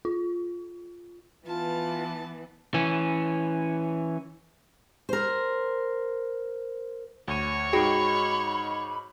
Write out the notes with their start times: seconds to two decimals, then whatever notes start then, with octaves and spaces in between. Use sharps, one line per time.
0.05 F4
1.46 E3 B3 F4 A5
2.74 E3 C#4
5.09 A#4 C5
7.28 D2 C#5 D#7
7.73 G#2 D#4 F#4 G#4 G5 B5